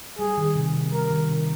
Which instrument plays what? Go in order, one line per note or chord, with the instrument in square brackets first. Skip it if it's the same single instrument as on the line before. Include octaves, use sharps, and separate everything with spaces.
[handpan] G3 [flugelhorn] G#4
[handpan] D#3
C3
C3
[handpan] G3 [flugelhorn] A#4
[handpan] D#3
C3